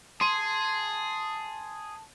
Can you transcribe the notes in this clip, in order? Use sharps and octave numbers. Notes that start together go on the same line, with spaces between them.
G#4 A5 C6 D#7